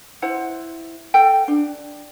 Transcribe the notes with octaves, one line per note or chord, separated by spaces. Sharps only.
E4 C5 F#5
A4 F#5 G5
D4